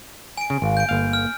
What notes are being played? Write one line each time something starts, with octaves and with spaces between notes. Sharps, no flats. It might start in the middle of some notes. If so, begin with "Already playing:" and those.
G#5 D7
C#3
G#1 F5
G6 D7
G1 A#3 F5
F6